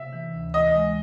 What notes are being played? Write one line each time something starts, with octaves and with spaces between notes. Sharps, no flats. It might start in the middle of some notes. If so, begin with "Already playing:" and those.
Already playing: C3 E5
E3
D2
E3 D#5
G#3